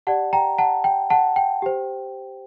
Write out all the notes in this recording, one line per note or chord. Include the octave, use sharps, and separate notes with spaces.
G4 D5 F#5 A5
G5 A#5
F#5 A5
G5
F#5 A5
G5
G4 C5